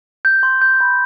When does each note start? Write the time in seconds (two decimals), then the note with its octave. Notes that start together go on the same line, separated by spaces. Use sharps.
0.25 G6
0.43 C6
0.62 G6
0.81 B5